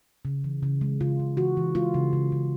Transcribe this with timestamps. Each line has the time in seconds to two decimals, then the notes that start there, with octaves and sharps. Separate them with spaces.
0.25 C#3
0.44 E3
0.63 C#3
0.81 G#3
1.01 C#3 F4
1.20 C#3
1.37 E3 F#4
1.57 E3
1.75 G#3 F4
1.94 C#3
2.13 C#3
2.32 C#3